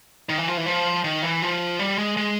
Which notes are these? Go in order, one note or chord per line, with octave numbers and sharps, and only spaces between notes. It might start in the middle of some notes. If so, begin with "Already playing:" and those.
D#3
E3
F3
E3
F3
D#3
E3
F3
G3
G#3
G#3